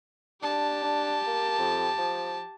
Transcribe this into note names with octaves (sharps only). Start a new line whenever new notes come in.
D4 G4 A5
D4
A#3
F2
F3